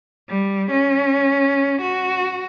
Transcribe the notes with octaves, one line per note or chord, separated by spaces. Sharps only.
G3
C#4
F#4